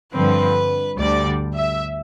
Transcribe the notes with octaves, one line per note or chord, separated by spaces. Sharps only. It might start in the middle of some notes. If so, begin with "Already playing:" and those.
G2 D3 F3 C4 B4
D2 D3 G3 D5
E5